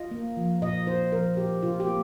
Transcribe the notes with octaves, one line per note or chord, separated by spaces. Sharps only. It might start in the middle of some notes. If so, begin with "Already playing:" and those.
Already playing: F4 D#5
A#3
F3
A#2 D#5
D#4 C5
F3 A#4
A#2 G4
C3 F4
G4
A#3